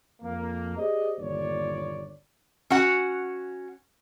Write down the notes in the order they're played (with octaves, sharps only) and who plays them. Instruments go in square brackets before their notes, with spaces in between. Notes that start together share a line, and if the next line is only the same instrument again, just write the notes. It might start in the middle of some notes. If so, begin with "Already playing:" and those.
[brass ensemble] F2 A#3
G4 G#4 C5 D5 D#5
G1 D#2 A#2 C#5 D5
[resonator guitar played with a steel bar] C#4 F#4 F#5